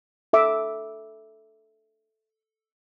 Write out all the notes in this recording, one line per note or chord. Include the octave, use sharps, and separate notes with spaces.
A4 E5 D6